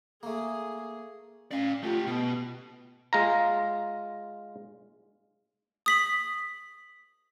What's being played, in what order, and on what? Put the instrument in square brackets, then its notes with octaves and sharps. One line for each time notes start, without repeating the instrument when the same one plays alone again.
[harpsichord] A3 A#3 [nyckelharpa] G#4
[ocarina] C#4 [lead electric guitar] D5 F5
[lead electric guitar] A3 G4 [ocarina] F4
[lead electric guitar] B2 [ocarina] B3
[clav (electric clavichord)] G#3 F4 A#5
[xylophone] D#6 B6 F#7